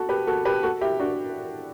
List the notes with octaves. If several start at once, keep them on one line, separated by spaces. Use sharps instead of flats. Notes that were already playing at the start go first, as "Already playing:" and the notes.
Already playing: F#4 A4
G4 B4
F#4 A4
G4 B4
F#4 A4
E4 G4
D4 F#4